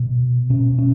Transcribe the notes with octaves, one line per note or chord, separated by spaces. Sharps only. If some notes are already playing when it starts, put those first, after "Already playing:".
Already playing: B2
B2 C#4
C#4